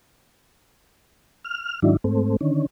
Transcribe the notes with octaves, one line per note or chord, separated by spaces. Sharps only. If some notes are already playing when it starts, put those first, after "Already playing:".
F6
G#2 D#3 F#3 D4 E4
G#2 A3 C4
D3 D#3 C#4